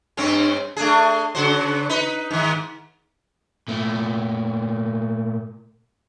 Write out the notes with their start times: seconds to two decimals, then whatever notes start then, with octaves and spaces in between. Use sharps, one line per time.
0.17 G2 C4 C#4
0.77 A3 D4 G#4
1.35 C#3 F#4 C5
1.89 D#4 B4
2.31 G#2 D#3
3.68 A#2 A3